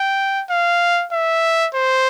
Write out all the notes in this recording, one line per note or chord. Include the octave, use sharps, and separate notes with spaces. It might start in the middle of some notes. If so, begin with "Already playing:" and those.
Already playing: G5
F5
E5
C5